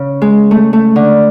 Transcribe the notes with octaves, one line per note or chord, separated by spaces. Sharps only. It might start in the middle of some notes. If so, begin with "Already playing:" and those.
Already playing: C#3
G#3
A3
A3
D3